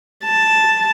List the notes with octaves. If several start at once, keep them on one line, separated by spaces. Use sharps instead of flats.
A5